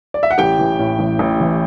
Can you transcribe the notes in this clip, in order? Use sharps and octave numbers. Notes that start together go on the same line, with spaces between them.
D5
E5
F#5
A1 G4 G5
E3
A2
A1
A1
E3